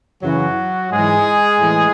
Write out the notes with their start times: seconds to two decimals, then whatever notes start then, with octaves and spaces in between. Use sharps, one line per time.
0.22 F#2 C#3 E3 F#3 F#4
0.91 G#2 E3 G#3 G#4
1.59 A2 E3